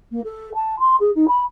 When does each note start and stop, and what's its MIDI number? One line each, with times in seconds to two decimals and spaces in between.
0.11 0.20 58
0.24 0.53 69
0.54 0.79 81
0.79 0.96 84
1.00 1.10 68
1.15 1.25 63
1.28 1.42 83